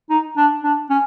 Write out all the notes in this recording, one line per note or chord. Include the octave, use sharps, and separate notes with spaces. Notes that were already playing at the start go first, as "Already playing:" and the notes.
D#4
D4
D4
C#4